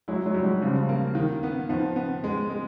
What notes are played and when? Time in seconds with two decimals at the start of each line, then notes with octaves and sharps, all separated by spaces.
0.08 F#3 G#3 E4
0.26 F#3 G#3
0.34 G3
0.44 F#3 G#3
0.62 C#3 F3 G3
0.89 A#3
1.15 D#3
1.43 B3
1.69 D#3 F3 B3
1.96 B3
2.24 G#3
2.50 G#3